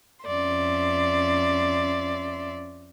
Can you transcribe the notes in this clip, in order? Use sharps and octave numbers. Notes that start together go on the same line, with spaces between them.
F2 C#4 D5 E5 C6